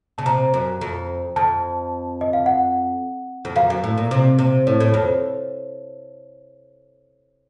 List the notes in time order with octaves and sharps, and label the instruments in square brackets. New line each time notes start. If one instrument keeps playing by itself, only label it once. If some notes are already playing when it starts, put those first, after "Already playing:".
[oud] C#3 [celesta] A5
[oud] C3 [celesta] A#5
[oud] F#2
F2
[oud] F2 [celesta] A5
[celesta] D#5
F5
F#5
[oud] F2
[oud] F#2 [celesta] F5
[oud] F#2
A2
A#2
C3
C3
[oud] A2 [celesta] C#5
[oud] A2
[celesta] C#5
[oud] F2
[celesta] C5